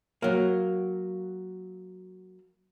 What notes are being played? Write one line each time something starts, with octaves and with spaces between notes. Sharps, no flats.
F#3 A#3